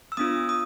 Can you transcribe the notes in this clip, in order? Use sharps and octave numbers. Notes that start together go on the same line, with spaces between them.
E6
B3 D4 F4 D#6
D#6